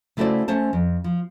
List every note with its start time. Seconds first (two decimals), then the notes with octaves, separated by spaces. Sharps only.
0.17 C#3 A3 E4 F#4 C5 D5
0.48 A3 C#4 C5 A5
0.73 F2
1.04 F3